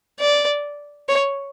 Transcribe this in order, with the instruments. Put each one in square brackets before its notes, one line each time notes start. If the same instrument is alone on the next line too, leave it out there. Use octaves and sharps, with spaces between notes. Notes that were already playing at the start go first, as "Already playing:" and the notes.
[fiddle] D5
C#5